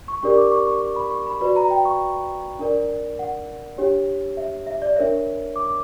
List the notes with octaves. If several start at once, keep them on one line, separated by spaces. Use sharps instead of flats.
C#6
D4 G4 A#4 D5 C#6
D6
C#6
C#6
C#6
B5
C#6
B5
F#4 B4 D5 B5
A#5
G5
C#6
D4 A#4 D5
F#5
D4 G4 C#5
E5
E5
D5
D4 A#4 C#5 E5
D6